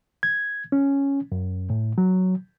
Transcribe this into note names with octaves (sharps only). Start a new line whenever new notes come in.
G#6
C#4
F#2
A2
F#3